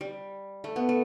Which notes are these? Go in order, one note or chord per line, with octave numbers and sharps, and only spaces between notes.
G3
A3
B3
A3